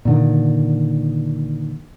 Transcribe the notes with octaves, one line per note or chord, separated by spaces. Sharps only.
A#2 D3 D#3